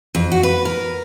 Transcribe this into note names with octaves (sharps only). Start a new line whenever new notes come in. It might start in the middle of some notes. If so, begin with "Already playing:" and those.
F2
F#4
B4
A#4